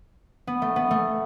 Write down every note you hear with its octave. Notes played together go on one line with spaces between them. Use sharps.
B3
A3
B3
A3